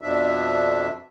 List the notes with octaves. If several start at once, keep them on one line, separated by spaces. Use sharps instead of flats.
F2 B2 F3 D4 E5